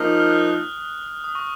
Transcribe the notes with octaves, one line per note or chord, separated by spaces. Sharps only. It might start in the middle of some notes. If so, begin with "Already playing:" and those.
Already playing: F3 A#3 D#4
F6
F#6
F6
D#6
D#6
C#6